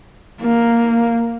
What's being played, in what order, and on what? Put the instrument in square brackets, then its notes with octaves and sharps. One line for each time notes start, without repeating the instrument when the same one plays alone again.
[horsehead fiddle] A#3